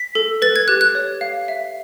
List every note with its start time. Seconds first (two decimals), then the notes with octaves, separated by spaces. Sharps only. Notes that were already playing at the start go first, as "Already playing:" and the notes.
Already playing: B6
0.15 A4
0.42 B4 A6
0.56 G#6
0.68 G4 F#6
0.81 F#6
0.95 C#5
1.21 F5
1.48 E5